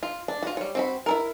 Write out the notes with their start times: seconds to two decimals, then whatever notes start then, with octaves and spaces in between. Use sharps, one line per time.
0.03 F4
0.28 D4
0.43 F4 F#4
0.57 G3 C#5
0.75 C4 F#4 B5
1.06 E4 A4 A#4